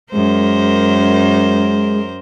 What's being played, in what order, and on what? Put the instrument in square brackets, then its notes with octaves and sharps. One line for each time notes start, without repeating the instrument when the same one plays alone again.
[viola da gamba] F#2 A#4 C5 [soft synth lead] G#3